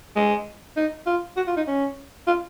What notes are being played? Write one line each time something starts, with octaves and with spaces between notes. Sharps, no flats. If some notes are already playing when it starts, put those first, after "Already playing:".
G#3
D#4
F4
F#4
F4
D#4
C#4
F4